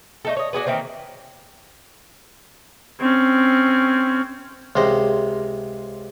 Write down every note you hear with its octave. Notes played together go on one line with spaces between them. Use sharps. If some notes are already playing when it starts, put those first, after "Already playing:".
A3 D#4 A4
C#5 D#5
D4 F#4 G#4 B4
D#3 E3 A#3 C4
C4 C#4
C#2 C3 C5 D#5